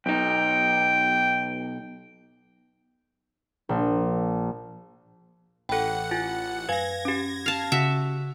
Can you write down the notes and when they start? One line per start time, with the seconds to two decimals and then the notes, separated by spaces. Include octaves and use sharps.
0.06 B1 D#4 G5
3.69 A#1
5.69 A1 A4 F#5 G5 B5
6.11 F4 G#5 A6
6.69 F#2 B4 F5 G#5 G#6 A#6
7.05 C#4 G4
7.46 F5 A5
7.72 C#3 F#4 E5